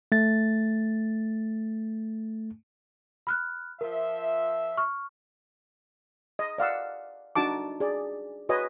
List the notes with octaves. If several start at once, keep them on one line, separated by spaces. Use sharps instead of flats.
A3 A6
B5 F6 F#6
F3 A#4 E5
C#6 F6
D#5
D5 F5 F#5 E6
D4 D#4 F#4 A5 D6
G#4 D5
F#4 B4 C#5 D#5 G#5